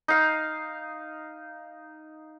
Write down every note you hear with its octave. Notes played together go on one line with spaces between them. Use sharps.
D#4 F5